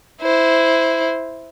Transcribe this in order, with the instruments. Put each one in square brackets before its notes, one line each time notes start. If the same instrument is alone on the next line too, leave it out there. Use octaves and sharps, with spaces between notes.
[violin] E4 C5